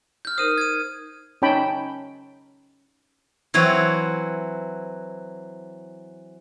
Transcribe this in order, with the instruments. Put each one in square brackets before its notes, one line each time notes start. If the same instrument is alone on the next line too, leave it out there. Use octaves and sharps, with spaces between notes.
[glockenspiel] F6 G6
[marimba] D#4 A#4 C5 [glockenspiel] D#6 D#7
[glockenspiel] G#6 D#7
[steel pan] C#4 D#4 C#5 G5 A5 B5
[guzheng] E3 F#3 C4 C#5